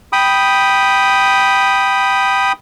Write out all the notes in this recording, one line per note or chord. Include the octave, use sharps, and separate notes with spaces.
G5 B5 D#6